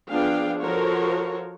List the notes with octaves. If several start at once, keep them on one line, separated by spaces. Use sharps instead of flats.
F3 B3 D4 G#4 F5 G5
F3 F#4 A4 A#4 C5 C#5